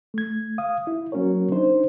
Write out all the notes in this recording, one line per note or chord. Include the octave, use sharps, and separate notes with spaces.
A3 G#6
F5 D#6
E4
F#3 A#3 C#4 F#4 A#4 C#5
D4 D#4 C5